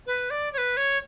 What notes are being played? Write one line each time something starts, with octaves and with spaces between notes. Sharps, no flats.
B4
D5
C#5
B4
C#5